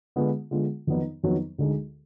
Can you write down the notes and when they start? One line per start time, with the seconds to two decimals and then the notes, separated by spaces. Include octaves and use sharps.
0.16 D3 G#3 B3 F4
0.51 D3 G#3 B3 F4
0.87 F2 D#3 F#3 B3 D#4
1.23 F2 D#3 F#3 B3 D#4
1.58 D2 D3 G#3 D#4 G#4